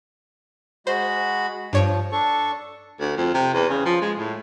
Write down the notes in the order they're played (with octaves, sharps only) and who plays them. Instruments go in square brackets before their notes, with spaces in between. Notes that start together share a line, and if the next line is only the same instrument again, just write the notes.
[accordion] G#3 F#4 B5 [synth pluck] C5
[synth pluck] G2 C#5 D7 [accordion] F3
[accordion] D4 A4 C#6
[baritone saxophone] D2
F2
C3
E2
C#3
F3
G#3
A2